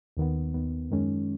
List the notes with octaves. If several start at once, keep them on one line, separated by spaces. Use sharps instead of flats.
D#2 D#3 B3
D#2 D#3 B3
F#2 D#3 G#3 C#4